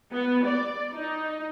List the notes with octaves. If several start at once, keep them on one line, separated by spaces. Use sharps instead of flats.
B3
D5
D#4